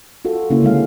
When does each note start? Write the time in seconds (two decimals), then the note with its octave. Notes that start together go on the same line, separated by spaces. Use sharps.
0.25 F4 F#4 A4
0.50 C#3 A#3 C#4 E4
0.63 D3 G#3 F5